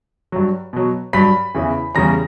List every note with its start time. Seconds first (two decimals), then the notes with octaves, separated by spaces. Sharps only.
0.32 G2 F#3
0.73 B2 F#3
1.13 G2 F#3 B5 B6
1.55 E2 C#3 E3
1.95 E2 C#3 G3 A#5 A#6